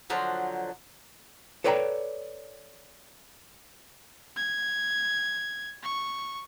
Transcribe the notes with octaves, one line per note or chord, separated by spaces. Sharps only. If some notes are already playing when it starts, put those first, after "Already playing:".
D3 F3 F#3 C5
A4 B4 C#5 D5 G5 A#5
G#6
C#6